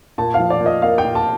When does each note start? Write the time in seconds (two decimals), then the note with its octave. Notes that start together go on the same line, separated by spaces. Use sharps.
0.18 A#2 A5
0.34 F5
0.40 F3
0.50 D5
0.60 A#2
0.66 D#5
0.82 A#3 F5
0.98 G5
1.05 A#2
1.15 A5